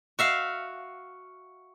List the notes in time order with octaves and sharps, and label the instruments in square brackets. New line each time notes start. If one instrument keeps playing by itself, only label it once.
[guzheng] F#4 E5 F5